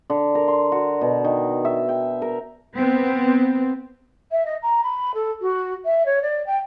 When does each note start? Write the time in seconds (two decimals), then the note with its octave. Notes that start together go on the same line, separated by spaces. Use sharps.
0.10 D3
0.35 A#4
0.48 C6
0.72 F#4
1.01 B2
1.24 D#3
1.65 E5
1.89 G5
2.22 A#4
2.75 B3 C4
4.31 E5
4.45 D#5
4.62 A#5
4.83 B5
5.14 A4
5.41 F#4
5.84 E5
6.05 C#5
6.22 D5
6.46 G5